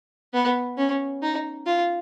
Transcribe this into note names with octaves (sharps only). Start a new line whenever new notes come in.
B3
C#4
D#4
F4